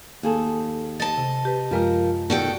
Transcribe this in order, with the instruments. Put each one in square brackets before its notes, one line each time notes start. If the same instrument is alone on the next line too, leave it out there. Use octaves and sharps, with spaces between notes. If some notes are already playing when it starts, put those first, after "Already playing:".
[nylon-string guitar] D#2 G#4 A4
[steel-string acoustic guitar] D#5 A5 [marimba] A6
[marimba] C3
G4 B4
[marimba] F#2 G#3 F4 [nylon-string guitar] F3 A#4
[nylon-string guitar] B2 D#3 [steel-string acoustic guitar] F#4 A4 G5 [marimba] D5 F#5 A5